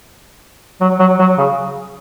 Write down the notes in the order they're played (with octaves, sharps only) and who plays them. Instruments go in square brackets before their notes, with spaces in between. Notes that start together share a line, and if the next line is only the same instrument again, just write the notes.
[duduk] F#3
F#3
F#3
C#3